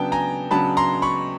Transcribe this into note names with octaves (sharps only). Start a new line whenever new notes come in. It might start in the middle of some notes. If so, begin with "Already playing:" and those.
Already playing: C#3 F#3 B3 D4 G5 A5
G#5 A#5
C#3 F#3 B3 D4 A5 B5
A#5 C6
B5 C#6